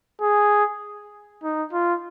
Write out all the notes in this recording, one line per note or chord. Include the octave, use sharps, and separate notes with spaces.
G#4
D#4
F4